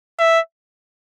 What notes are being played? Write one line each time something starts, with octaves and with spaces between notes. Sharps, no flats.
E5